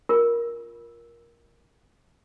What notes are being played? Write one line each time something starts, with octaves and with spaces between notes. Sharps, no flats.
F4 A#4